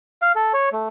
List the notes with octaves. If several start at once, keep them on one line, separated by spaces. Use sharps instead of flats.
F5
A4
C#5
A3